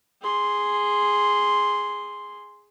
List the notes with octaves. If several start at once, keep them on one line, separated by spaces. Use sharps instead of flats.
G#4 C6